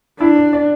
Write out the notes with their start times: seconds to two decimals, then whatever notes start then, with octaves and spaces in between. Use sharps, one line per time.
0.20 D4 E4
0.36 D5
0.53 D5